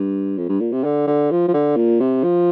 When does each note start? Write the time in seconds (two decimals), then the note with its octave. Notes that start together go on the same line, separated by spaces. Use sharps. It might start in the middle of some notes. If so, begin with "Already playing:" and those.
Already playing: G2
0.38 F2
0.49 G2
0.61 A#2
0.72 C3
0.84 D3
1.07 D3
1.31 F3
1.48 F3
1.54 D3
1.76 A#2
2.00 C3
2.24 F3